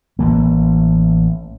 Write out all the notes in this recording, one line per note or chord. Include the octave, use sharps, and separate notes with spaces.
A1 E3 A#3